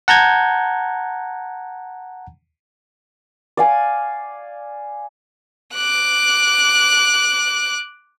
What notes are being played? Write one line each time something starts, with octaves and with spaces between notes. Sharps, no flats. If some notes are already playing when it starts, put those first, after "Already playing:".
F#5 A5 A#5 G6 G#6
D5 F5 G#5
D6 F#6